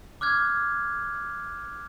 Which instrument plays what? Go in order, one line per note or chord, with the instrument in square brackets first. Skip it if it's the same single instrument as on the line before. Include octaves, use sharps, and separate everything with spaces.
[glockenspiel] D6 F6 F#6 G#6